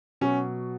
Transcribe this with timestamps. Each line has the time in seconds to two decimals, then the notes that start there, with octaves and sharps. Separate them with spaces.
0.21 B2 F#3 C#4